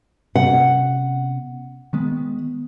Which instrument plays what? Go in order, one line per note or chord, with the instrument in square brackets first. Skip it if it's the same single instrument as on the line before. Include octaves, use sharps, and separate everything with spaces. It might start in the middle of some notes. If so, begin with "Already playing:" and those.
[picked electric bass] C3 B3 C#4 [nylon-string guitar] F#5
[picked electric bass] D#3 G#3 B3